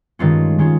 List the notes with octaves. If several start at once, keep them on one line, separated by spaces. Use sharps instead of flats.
G2 D#3 G#3 C#4 F4
D#3 G#3 C#4 F4